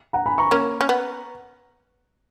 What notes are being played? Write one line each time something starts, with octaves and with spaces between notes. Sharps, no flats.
F#5 A#5
G#5 B5
A#5 C#6
A#3 C#4
C#4
B3